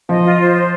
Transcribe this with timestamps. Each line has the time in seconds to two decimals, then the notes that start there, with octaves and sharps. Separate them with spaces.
0.09 F3 D#5
0.24 F4
0.40 C5
0.55 C5